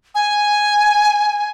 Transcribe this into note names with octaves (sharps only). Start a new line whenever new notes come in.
G#5